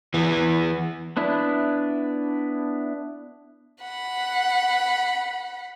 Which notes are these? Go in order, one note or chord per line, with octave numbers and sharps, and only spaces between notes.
E3 B3
B3 D4 E4
F#5 B5